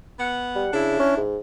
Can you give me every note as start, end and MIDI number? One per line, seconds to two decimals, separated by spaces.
0.20 0.68 59
0.20 0.68 78
0.56 0.71 55
0.74 0.96 49
0.74 1.20 62
0.74 1.20 64
1.00 1.13 61
1.17 1.39 44